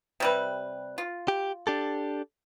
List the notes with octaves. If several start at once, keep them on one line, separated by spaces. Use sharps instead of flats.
C3 G3 B4
F4
G4
D4 G4 A4